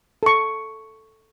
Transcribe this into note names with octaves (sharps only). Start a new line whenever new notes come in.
A4 C#6